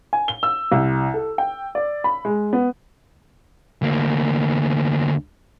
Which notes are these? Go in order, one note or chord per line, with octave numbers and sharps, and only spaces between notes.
G#5
G7
E6
C2
A4
G5
D5
B5
G#3
B3
D2 A#3